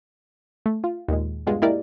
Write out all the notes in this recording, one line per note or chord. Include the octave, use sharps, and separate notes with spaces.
A3
F4
D#2 A#2 G#3
G2 B2 G#3 F4
G#3 A#3 E4 G4 A#4 D5